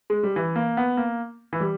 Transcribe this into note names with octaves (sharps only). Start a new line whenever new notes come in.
G#3
G3
E3
A#3
B3
A#3
E3
G3